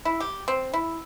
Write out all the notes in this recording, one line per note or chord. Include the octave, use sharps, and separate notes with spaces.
E4
G4
C4
E4